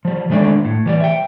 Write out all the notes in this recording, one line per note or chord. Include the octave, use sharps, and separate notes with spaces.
F3 G3
D#3 G#3 A3 D4 D5
A2
E3 G3 D5
E5 G5